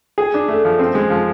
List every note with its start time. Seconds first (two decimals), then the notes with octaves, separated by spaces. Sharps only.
0.18 G#4
0.34 D4
0.48 A3
0.65 F3
0.79 C4
0.95 G#3
1.10 F3